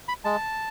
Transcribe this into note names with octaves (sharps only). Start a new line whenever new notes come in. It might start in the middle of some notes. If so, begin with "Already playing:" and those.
B5
G#3 A5